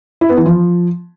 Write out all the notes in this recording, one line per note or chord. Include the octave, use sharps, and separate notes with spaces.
E4
B3
E3
F3